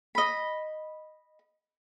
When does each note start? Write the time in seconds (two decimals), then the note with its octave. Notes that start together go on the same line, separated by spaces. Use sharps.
0.15 D#5 B5